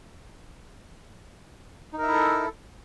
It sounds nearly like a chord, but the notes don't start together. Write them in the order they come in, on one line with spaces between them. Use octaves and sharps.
D#4 A#4 E5 E4 A4